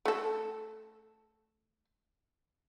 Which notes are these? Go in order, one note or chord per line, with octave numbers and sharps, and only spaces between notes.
A3 A4